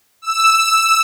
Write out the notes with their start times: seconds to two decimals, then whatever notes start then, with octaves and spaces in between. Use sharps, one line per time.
0.22 E6